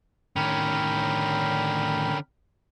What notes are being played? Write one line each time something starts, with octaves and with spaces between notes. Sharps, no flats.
A2 D3 D#3 C#4 A#4 G5 B5